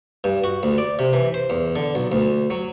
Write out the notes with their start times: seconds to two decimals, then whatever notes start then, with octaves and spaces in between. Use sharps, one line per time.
0.24 G2
0.44 F#4
0.63 D2
0.78 D5
0.99 C3
1.13 E3
1.34 C5
1.50 E2
1.76 D3
1.95 B1
2.12 D2
2.50 F#3